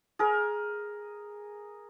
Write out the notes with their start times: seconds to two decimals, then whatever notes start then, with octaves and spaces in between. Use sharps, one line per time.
0.19 G#4 A#4